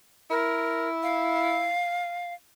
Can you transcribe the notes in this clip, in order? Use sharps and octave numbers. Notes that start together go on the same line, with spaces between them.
E4 A#4
F5